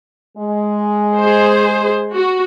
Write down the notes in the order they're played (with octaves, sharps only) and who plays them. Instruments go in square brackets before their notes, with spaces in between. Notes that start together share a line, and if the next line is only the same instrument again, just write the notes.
[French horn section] G#3
[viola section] G#4 C5
F#4